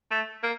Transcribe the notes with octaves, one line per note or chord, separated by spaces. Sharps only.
A3
A#3